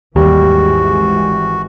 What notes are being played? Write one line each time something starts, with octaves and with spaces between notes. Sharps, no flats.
G#1 D#2 E3 G3 G#3 F#4